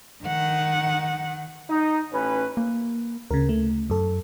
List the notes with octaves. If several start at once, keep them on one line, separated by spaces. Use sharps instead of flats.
D#3 F#5
D#4
A1 C#4 B4
A#3
D2 C#3 A#4
A3
F#2 A4